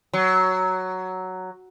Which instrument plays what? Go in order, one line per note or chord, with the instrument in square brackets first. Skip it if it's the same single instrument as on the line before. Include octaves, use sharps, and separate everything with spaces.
[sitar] F#3